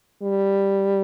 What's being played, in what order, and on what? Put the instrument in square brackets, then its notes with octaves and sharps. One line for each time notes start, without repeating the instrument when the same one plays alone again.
[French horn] G3